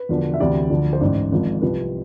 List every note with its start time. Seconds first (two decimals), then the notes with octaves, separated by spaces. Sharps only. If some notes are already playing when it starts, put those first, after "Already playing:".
Already playing: B4
0.09 E1 E2 D3 F3
0.34 E5
0.39 D2 C3 E3 D5
0.70 D2 D3 F3
0.93 C5
1.01 A1 G#2 E3 D5
1.32 G#1 G#2 F3
1.62 C2 C3 F3 B4